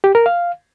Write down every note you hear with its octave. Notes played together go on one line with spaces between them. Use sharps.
G4
A#4
F5